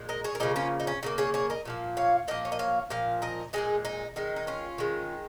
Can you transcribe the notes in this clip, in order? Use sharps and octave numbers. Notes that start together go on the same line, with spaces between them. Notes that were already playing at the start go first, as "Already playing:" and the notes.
Already playing: A#2 G#3
A#4 D#5
G#4 C#5
A#4
C#3 F3 A#3 D#4 G#4
C#4 F4
D#4
C#4
C#3 F3 A#3 D#4
G#4 C#5
G#4 C#5
A#4 D#5
A#2 F3 A#3
C#5 F5
A#2 F3 A#3 A#4 D#5
C#5
D#5
C#5 F5
A#2 F3 F5
A#4 D#5
A#2 F3 G#3 D#4 G#4
D#4
D#3 G#3 D#4
D#4
C#4 F4
D#3 G#3